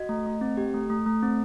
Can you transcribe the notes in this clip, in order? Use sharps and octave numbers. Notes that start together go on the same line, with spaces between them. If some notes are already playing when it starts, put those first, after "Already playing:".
Already playing: F#4 D#5
A3
A3
C4
G4
A3
A3
A3
C4